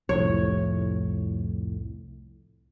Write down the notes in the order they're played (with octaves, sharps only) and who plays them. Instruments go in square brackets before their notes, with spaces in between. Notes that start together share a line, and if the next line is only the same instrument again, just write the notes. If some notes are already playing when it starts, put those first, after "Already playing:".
[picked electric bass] C2 F2 A2 [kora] C#5